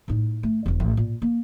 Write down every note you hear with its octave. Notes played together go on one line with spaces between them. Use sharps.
A2 D#4
A3
E1 D3
A1
A#2
A#3